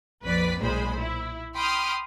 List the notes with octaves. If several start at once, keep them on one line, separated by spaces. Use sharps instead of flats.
A#1 F2 B4 D5 B6
B1 A#2 G#3 C5 B5
E4
G5 B5 C6 D6 D#6 F6